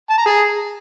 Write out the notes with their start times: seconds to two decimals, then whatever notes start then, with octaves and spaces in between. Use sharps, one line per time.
0.10 A5
0.18 A#5
0.26 G#4